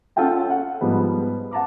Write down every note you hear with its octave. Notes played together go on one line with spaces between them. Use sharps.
C#4 F4 A4 F#5 G5 A5
F#5
G#2 F3 G3 B3
F#5 A5 A#5 D6